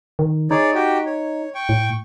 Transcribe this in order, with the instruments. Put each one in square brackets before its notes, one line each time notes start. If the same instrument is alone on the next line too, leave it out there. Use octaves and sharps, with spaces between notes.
[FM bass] D#3
[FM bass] D#4 [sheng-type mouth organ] G#4 C#5 D5
[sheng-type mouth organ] F#4 G4 G5
C#5
G5 C#6
[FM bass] A2